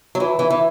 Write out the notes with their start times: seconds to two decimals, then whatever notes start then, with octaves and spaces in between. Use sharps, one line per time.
0.15 F#3
0.20 E3
0.39 E3
0.50 E3